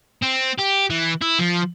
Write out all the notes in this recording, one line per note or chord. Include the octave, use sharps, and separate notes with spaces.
C4
G4
E3
E4
F3